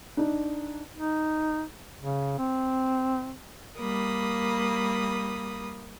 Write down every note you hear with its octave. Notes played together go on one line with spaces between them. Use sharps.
D4 D#4
D#4
C#3
C4
G3 A#3 B5 D#6